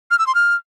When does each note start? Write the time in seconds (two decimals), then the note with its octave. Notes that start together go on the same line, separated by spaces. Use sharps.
0.11 F6
0.19 E6
0.27 C6
0.35 F6